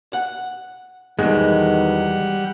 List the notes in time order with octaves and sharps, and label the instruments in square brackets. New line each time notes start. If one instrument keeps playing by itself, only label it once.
[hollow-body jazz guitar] F#5
[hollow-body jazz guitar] E2 G#2 [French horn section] B2 D#3 [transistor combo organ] G3 F#5 [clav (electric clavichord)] G#3